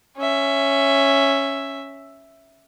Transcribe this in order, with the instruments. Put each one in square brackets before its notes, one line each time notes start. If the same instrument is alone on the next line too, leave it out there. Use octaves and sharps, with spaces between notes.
[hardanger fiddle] C#4 E5